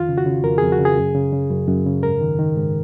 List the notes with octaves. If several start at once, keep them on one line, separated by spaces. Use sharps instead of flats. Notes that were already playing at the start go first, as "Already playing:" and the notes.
Already playing: F2 D#3 F4
C#3
F#4
C#3
F2 A#4
F2 G#4
F#4
C#3
G#4
F#2
C#3
C#3
F#2
F#2
C#3
G#2 A#4
D#3
D#3
G#2